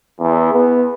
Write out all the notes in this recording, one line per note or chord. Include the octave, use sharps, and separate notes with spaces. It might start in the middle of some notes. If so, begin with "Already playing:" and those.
E2
B3